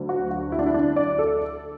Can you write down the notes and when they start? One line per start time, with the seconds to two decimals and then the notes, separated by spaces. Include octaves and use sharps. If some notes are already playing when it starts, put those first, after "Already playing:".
Already playing: D2 D3 F#3
0.09 F#4
0.31 F#4
0.52 E4
0.59 D4
0.66 E4
0.74 D4
0.96 D5
1.19 A4